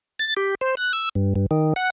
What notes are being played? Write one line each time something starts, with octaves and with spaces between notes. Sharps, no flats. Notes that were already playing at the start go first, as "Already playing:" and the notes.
A6
G4
C5
F#6
E6
G2
G2
D#3
F#5